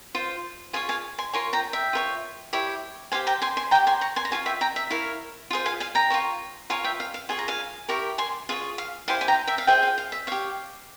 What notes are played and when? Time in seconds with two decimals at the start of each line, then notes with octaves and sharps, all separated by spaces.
0.15 F4 C5
0.73 F4 G#4 C#5 F5 G#5
0.89 F5 G#5
1.18 G#5 C6
1.33 F4 A#4 C#5 G#5 C6
1.53 G5 A#5
1.73 E5 G5
1.93 F4 A#4 C#5
2.53 E4 G4 C#5
3.12 G4 C5 F5 G#5
3.27 G5 A#5
3.42 G#5 C6
3.57 G#5 C6
3.71 G4 C#5 G5 A#5
3.87 G#5 C6
4.01 A#5 C#6
4.16 G#5 C6
4.25 A#5
4.31 F4 G#4 C#5 F5 G#5
4.46 E5 G5
4.61 G5 A#5
4.76 E5
4.90 E4 A#4 C#5 F5
5.50 F4 G#4 C5
5.66 F5 G#5
5.80 F5 G#5
5.95 G5 A#5
6.10 F4 A#4 C#5
6.70 F4 A#4 C#5 F5 G#5
6.84 E5 G5
7.00 F5
7.14 F5
7.29 F4 G#4 C#5 G#5
7.39 A#5
7.48 F5 G#5
7.89 E4 G4 A#4 A#5 C#6
8.18 G#5 C6
8.49 F4 G#4 C#5 F5
8.78 F5
9.08 E4 G4 C5 F5 G#5
9.21 G#5
9.28 G5 A#5
9.47 E5 G5
9.58 F5
9.67 F4 G#4 C5 E5 G5
9.83 F5
9.98 F5
10.12 E5
10.27 G4 C#5 F5